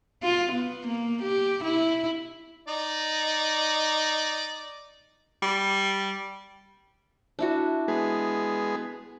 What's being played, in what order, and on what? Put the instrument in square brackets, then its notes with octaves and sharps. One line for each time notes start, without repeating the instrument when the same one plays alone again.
[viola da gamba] F4
B3
A#3
G4
E4
[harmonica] D#4 D5
[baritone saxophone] G3
[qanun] D4 E4 F#4
[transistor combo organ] G#3 B3 G#4